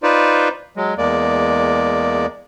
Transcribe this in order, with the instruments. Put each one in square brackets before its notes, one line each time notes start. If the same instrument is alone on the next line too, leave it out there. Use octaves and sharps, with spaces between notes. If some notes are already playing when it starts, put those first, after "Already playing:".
[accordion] D#4 F4 B4 C5 D5
F#3 G#3
E2 G#3 A#3 D5